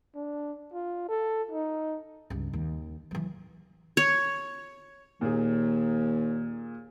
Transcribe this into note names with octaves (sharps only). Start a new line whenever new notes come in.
D4
F4
A4
D#4
C#2 G2
D#2
E3 F#3
C#5
D#2 A#2 G#4